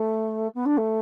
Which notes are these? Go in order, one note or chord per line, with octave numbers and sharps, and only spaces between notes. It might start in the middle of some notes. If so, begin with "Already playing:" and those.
Already playing: A3
B3
D4
A3